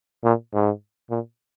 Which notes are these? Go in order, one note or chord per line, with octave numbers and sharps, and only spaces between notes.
A#2
G#2
A#2